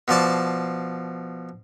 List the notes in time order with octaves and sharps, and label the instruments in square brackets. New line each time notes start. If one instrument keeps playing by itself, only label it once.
[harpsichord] B2 F3 D5 A5